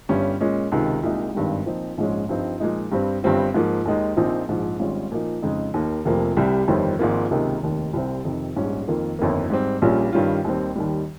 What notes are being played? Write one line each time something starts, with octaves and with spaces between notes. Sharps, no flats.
G1 G2 G3 C#4
A#2 G#3 C#4
C#2 C3 D#3
C2 A#2 G#3 D#4
G#1 G2 D#3 G3
A#2 F3 C4 D#4
A#1 G#2 F3 G#3 C#4
G2 F3 C4 D#4
A#2 F3 G#3 D#4
G2 G3 C4
G1 G2 G3 C4 F4
G#2 F3 A#3
D#2 D#3 G#3 D#4
A#1 A#2 F3 C4 D#4
A#1 G#2 F3
G#1 G#2 G3 C#4 F4
A#2 F3 A#3 D#4
F2 C#3 G#3 D#4
D#2 D#3 A#3
F1 F2 C3 F3 A#3
C2 C3 G3
G1 F2 D#3 G3 C4
G#1 G#2 F3 A#3
C#2 C3 D#3 A#3 D#4
F1 D#2 D#3
C2 C3 G3 C4
F2 C3 D#3
A#1 G#2 G3 C#4
F2 D#3 A#3 F4
G1 F2 D#3 A#3
G#2 G3 C4
A#1 A#2 G3 C#4 F4
G2 D#3 G3 C#4 F4
D#2 D#3 G3 C4
D#2 D#3 G3